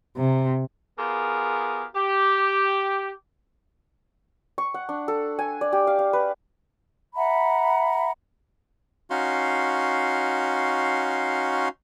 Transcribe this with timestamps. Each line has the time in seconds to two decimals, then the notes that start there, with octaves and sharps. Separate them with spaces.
0.17 C3
0.99 B3 F4 G4 G#4 A#4
1.96 G4
4.58 C#6
4.74 F#5
4.89 D4
5.08 A4
5.39 G#5
5.61 D5
5.73 G4
5.87 F5
5.99 F5
6.13 B4
7.15 E5 F#5 A#5 B5
9.10 C#4 D#4 F#4 F5 C6